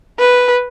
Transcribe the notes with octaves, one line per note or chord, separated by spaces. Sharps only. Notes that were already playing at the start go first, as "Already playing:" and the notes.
B4